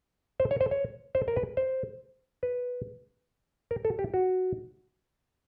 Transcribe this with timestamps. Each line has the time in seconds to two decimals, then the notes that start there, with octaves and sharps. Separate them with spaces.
0.40 C5
0.51 C#5
0.61 C5
0.71 C#5
1.15 C5
1.28 A#4
1.36 B4
1.57 C5
2.43 B4
3.71 A#4
3.85 A4
3.99 G4
4.14 F#4